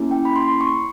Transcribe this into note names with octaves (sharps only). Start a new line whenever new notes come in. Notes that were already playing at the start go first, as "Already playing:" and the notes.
Already playing: A#3 C#4 E4 G#4
G5
B5
C6
C#6